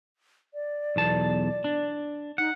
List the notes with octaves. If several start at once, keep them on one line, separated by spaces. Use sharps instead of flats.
D5
B1 E2 A5
D4
D#4 F#5